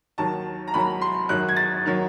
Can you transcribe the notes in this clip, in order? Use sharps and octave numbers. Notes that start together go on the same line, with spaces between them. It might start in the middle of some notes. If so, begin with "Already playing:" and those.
D#2 D#3 F#3 A5
A#5
D#2 D#3 F#3 B5
C6
F#2 D#3 F#3 F#6
G#6
A6
D#3 F#3